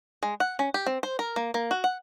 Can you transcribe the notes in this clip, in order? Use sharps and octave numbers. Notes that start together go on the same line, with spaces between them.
G#3
F#5
C#4
G4
C4
C5
A#4
A#3
A#3
F#4
F#5